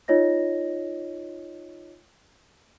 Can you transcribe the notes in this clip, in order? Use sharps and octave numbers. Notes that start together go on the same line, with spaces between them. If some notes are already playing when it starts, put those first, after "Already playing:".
D#4 F4 C#5 D#5 A#6